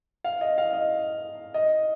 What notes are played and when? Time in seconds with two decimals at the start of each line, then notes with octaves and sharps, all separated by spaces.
0.24 F5
0.41 D#5
0.58 F5
0.73 D#5
1.54 D#5